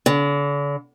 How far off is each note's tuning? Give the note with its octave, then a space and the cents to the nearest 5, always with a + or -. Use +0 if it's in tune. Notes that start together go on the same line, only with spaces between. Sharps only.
D3 -45